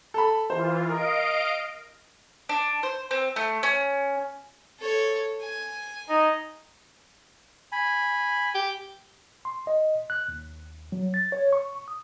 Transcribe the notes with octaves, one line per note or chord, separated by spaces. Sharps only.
A4 B5
E3 F4 C5
A#4 D#5 F5 D7
D4
C5
C4
A3
C#4
A4 C#5
G#5
D#4
G#5 B5
G4
C6
D#5
F#6
D#2
F#3
A6
C#5
C#6
D#6